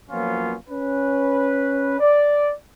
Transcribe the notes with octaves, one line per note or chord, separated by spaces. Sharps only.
F3 F#3 A#3 B3 C#4 F4
C#4 B4
D5